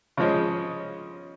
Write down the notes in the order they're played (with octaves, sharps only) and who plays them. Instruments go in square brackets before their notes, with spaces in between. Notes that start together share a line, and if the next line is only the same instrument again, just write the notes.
[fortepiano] C#3 F3 G#3 C#4